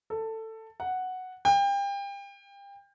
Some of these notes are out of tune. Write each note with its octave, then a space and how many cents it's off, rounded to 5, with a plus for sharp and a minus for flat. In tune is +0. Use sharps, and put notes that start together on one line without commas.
A4 +15
F#5 +0
G5 +30